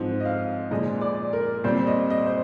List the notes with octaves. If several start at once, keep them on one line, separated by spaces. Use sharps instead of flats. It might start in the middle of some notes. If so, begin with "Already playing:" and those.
Already playing: G#2 F3 C4
D#5
F5
A#2 F3 G#3 D#5
D5
A#4
A#2 G3 C4 C5
D#5
D#5
C5